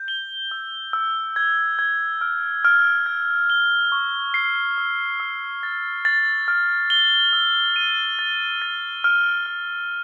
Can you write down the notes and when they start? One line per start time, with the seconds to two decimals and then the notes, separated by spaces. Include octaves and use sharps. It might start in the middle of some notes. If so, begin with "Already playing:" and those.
Already playing: G6
0.08 G7
0.51 E6
0.93 E6
1.36 G#6
1.79 G#6
2.21 F6
2.65 F6
3.06 G#6
3.50 G7
3.92 C#6
4.34 C7
4.78 E6
5.20 E6
5.63 A6
6.05 A6
6.48 F6
6.90 G7
7.33 E6
7.76 D#7
8.19 A6
8.62 A6
9.04 F6
9.46 F6